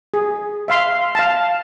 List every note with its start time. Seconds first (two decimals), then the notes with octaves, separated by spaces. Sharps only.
0.14 G#4
0.68 E5 F5 C6
1.15 F5 A5